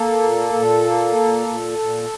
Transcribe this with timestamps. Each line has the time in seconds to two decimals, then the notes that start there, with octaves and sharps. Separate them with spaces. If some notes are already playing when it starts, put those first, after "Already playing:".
Already playing: A#3 A4
0.22 A#2
0.53 A#2
0.85 A#3
1.16 A#2
1.47 A#2
1.78 A#2